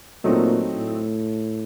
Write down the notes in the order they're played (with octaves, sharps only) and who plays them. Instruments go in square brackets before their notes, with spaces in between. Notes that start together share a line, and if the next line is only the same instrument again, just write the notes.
[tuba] A#2 [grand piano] F#3 A3 C4 D#4
[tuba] A2